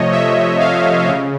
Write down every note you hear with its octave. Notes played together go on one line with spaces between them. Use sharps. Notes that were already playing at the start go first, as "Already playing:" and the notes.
Already playing: C3 F3 A3 C#5 D#5
E5
F5
C#3